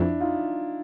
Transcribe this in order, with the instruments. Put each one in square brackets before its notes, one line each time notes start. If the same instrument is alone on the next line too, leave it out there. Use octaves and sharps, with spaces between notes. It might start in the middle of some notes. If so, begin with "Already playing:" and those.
Already playing: [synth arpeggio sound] F2 [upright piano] D4 E4
[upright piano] D#4 F4